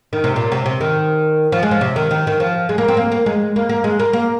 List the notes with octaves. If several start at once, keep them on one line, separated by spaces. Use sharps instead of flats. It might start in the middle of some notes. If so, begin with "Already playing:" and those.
D#3
C3
A#2
C3
C3
D#3
F3
G#3
F3
C3
D#3
D#3
D#3
F3
G#3
A#3
C4
A#3
A#3
G#3
A#3
A#3
G#3
A#3
A#3